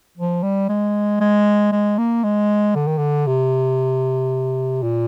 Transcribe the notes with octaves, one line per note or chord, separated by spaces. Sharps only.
F3
G3
G#3
G#3
G#3
A#3
G#3
D3
D#3
D3
C3
A#2